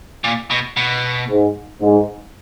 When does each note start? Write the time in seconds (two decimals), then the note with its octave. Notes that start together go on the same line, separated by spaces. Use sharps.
0.24 A#2
0.50 B2
0.77 B2
1.30 G#2
1.81 G#2